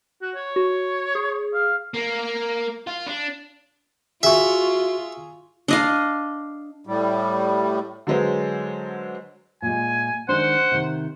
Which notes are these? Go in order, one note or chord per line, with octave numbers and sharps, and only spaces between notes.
F#4
C#5
F#4
G#4
F5
A#3
F4
D4
F4 F#4 G#4 E5 C#6
D4 D#5 F5
A2 G3
D3 F#3 G#3 B4 C5
A#2 G#3 G#5
D#3 G#3 D4 C5 F#5
C3 D#3